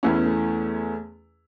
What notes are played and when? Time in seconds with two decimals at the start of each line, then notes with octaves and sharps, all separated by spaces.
0.03 E2 E3 A3 C#4 E4
0.14 B3
0.25 A3